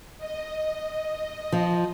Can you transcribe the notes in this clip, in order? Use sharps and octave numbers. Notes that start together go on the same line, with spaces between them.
D#5
F3